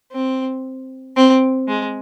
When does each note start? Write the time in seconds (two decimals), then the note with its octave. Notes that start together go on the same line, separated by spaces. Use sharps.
0.12 C4
1.16 C4
1.68 G#3